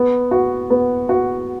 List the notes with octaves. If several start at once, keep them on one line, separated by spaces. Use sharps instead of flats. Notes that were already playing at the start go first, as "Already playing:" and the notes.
Already playing: B3
F#4
B3
F#4